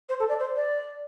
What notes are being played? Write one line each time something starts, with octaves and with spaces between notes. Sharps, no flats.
C5
A4
D5
C5
D5